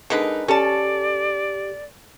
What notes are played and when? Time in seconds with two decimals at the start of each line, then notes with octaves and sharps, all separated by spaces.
0.10 D3 G#3 D#4 A#4 B4
0.48 C#4 G4 A4 D5 A5